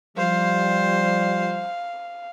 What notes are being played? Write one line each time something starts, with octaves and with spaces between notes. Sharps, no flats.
F3 G3 C5 F5